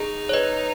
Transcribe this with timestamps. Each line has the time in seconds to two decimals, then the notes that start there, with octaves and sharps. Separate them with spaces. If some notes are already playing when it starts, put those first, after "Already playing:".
Already playing: D#4 G#4
0.29 C#5
0.33 B4 D#5